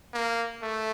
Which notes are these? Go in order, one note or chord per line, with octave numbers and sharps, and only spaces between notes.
A#3
A3